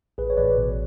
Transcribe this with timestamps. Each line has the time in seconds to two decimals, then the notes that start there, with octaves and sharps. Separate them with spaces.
0.18 A1 G#4 B4
0.30 C#5
0.37 A1 B4 D5
0.57 B2